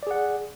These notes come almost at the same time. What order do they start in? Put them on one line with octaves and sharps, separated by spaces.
D5 G#4 F#5